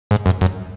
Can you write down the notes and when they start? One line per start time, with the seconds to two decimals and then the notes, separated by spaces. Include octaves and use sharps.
0.11 G#2
0.26 F#2
0.41 F#2